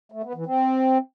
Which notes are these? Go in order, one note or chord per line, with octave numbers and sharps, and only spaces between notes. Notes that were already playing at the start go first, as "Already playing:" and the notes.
A3
B3
E3
C4